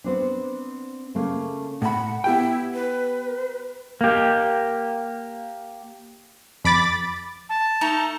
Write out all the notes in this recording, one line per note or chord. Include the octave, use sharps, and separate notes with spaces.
B3 C4 D4
C#3 A3 A#3
A2 F#5 B5
B3 E4 G4 G5
B4
A#3 G4
F2 B5 D6 A6
A5
A3 D#4 A#5